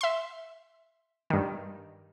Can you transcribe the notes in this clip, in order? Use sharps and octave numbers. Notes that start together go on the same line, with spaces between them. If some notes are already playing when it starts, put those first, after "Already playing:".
E5 C6
G2 D#3